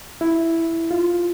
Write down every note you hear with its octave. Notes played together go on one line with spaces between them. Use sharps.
E4
F4